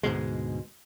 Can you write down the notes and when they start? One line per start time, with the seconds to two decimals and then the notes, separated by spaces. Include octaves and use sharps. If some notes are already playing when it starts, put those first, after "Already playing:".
0.03 D2 G#2 B2 G#3